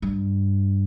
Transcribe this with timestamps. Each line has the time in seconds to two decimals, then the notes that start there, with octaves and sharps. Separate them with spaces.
0.02 G2